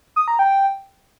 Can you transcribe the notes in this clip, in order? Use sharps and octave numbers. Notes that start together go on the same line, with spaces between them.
D#6
A#5
G5